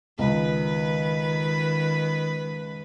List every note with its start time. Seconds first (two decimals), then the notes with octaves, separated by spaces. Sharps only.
0.19 C#2 D#3 B4